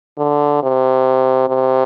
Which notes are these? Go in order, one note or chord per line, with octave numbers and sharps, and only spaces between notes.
D3
C3
C3